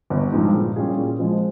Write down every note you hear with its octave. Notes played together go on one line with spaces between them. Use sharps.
G1
G2 F3 G#3 D#4
A#2
G3 C#4 F4 G#4
A#2
F3 G#3 C4